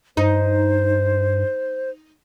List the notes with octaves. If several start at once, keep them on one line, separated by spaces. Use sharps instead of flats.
G2 D#4 C5